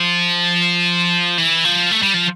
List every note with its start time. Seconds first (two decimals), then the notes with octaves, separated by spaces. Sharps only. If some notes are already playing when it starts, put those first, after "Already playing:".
Already playing: F3
1.38 E3
1.65 F3
1.91 A3
2.02 G3
2.14 F3